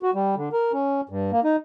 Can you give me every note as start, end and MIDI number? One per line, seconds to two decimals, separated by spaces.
0.03 0.11 66
0.14 0.35 55
0.36 0.49 50
0.52 0.72 70
0.73 1.01 61
1.09 1.31 43
1.32 1.40 58
1.44 1.56 63